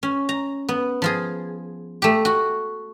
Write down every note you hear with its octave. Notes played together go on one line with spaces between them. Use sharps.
C#4
A#5
B3
F3 F4 G#4
A3 G4
F#4